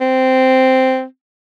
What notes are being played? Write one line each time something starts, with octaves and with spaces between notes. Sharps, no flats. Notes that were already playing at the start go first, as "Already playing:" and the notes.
C4